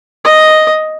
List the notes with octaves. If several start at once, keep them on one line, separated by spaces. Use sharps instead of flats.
D#5